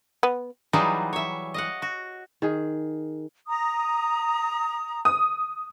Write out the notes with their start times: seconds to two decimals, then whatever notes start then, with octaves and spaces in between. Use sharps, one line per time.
0.23 B3
0.73 E3 F#3 G3 D#4 F4 G#4
1.13 C#5 E5
1.54 D#5 F5 F#5
1.82 F#4
2.42 D#3 G#4
3.47 A#5 D#6
5.05 D#6